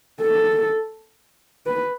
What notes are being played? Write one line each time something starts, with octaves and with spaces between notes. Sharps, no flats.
A4
B4